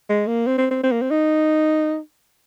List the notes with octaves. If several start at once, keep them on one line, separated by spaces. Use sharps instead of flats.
G#3
A#3
C4
C4
C4
C4
A#3
C4
D#4